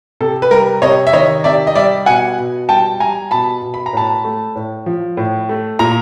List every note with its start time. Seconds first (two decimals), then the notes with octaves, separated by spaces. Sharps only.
0.20 C3 A4
0.42 B4
0.51 G3 A#4
0.82 C3 C#5 D#5
1.07 E5
1.13 D#3 C#5 D#5
1.44 C3 D5 E5
1.67 D#5
1.75 G3 D5 E5
2.06 B2 F#5 G#5
2.38 B2
2.69 G3 G5 A5
3.00 G3 G#5 A#5
3.31 B2 A5 B5
3.62 B2
3.74 B5
3.86 A#5
3.93 A2 A5 B5
4.25 A3
4.56 A2
4.86 F3
5.17 A2
5.49 A3
5.79 A#2 A#5